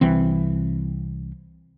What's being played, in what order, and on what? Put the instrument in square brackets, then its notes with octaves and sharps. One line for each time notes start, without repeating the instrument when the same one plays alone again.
[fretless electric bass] C2 E3 C4